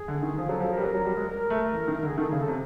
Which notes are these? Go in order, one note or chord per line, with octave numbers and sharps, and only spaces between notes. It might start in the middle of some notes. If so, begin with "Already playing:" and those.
Already playing: G#4
D3
D#3
F3 G#4
F#3 A4
F3 A4
A#4
G3
F#3 A#4
F#3
G3
G#3
A#4
A3
E3
D#3
D3
G#4
D#3 A4
C#3 G#4
A4
C3